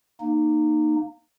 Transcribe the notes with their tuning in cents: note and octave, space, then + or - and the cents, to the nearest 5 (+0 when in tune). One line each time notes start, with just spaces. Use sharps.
A#3 +0 D#4 -20